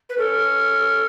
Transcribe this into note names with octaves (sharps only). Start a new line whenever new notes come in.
B4
C#4 A4